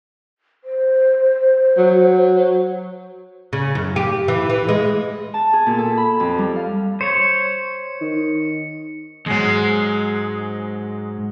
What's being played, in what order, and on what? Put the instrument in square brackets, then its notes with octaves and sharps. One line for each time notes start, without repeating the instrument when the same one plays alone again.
[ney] C5
[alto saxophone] F#3
[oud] C#3
F#2
G4
E3
E3
G#3
[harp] A5
G#4
A#2
A4
B5
F2
G3
F5
[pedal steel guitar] C5 C#5 [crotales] C#7
[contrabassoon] D#3
[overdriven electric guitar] D#2 G#2 [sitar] F#3 G#3